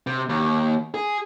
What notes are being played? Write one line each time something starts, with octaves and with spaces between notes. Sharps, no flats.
C3
D#2
G#4